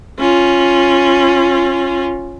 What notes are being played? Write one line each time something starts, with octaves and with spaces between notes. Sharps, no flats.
C#4 F4